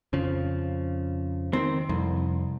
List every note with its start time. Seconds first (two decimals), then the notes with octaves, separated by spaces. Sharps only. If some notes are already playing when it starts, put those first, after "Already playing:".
0.13 F2 C#3 F3
1.53 D#3 C4
1.89 C2 F2